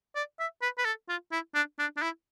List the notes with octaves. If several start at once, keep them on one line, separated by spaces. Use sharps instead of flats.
D5
E5
B4
B4
A4
F4
E4
D4
D4
D4
E4